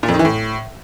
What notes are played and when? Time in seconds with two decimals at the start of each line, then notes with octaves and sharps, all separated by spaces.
0.03 A#2
0.08 F2
0.14 D#3
0.19 E3
0.25 A2